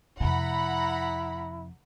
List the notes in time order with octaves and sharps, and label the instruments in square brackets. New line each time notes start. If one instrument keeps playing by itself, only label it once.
[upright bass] F2 C3 [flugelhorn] E4 [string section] F#5 A#5 B5